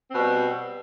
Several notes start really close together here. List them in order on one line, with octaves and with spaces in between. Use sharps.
C4 B2 G3